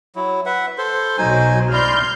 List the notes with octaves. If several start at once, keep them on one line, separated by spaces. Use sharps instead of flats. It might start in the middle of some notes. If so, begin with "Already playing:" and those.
F#3 E4
B4 E5 F#5
A4 C5 C6
B1 F#3 D#4 C5 G#5
E4 D5 A#5 C6 F6 G6